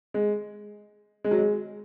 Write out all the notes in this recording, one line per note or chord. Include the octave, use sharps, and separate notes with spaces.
G#3
G#3
F#3
G#3